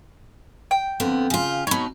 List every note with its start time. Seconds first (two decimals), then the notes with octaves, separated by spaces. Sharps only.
0.71 G5
1.00 F2 D3 B3
1.30 C#3 F4
1.67 B2 D#4 C#5 B5